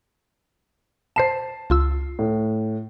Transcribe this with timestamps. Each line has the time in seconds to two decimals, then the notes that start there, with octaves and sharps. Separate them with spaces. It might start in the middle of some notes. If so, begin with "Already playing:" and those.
1.16 C5 A5 C7 E7
1.70 C#2 F4 E6
2.19 A2